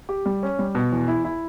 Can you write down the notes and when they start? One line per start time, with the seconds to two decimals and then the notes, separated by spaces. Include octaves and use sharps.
0.09 G4
0.26 G3
0.43 C#4
0.59 G3
0.75 B2
0.92 E2
1.08 E4
1.24 E4